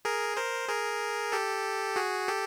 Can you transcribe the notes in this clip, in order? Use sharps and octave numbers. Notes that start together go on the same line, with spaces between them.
G#4 A#4
A#4 C5
G#4 A#4
G4 A4
F#4 G#4
G4 A4